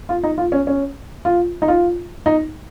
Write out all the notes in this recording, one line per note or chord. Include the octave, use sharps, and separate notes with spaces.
F4
D#4
F4
C#4
C#4
F4
D#4
F4
D#4